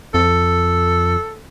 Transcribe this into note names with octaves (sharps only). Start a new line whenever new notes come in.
F2 A4